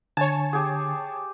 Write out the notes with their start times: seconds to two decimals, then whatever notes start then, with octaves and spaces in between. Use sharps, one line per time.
0.17 D3 C#5 G#5 A5
0.53 G4 G#4